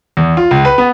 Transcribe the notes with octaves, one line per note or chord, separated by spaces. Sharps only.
E2
F4
C#2
B4
B3